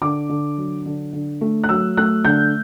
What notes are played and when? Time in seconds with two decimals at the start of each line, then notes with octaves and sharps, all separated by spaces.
0.02 D3 D6
0.29 D3
0.57 F#3
0.86 D3
1.13 D3
1.41 A3
1.64 F#6
1.69 F#3 E6
1.97 A3 F#6
2.25 D3 G6